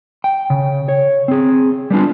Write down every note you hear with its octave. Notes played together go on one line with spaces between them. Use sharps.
G5
C#3
C#5
C4 G#4
G3 B3 D4 F4